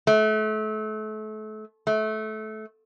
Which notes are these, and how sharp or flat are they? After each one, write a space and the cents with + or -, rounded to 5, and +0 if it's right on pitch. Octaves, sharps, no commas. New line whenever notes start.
A3 -30
A3 -20